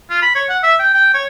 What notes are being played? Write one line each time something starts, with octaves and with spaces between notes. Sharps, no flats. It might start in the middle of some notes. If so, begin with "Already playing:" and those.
F4
B5
C#5
F#5
E5
G5
G5
C#5